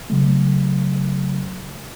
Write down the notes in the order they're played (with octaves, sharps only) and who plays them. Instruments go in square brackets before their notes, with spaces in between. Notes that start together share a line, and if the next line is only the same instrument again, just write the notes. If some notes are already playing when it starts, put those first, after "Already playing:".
[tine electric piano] C#3 F#3 A3